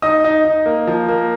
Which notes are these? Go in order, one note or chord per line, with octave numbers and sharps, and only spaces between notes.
D#4 D#5 D#6
D#4
D#4
A#3
F3
A#3